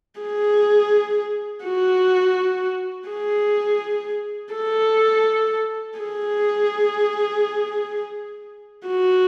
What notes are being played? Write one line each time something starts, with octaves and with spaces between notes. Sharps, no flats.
G#4
F#4
G#4
A4
G#4
F#4